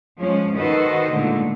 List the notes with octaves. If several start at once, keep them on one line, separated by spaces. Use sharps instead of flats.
F3 G#3 C#4
D#3 F#4 A4 B4 C5 D#5
A#2 D3 D#3 G#3 A3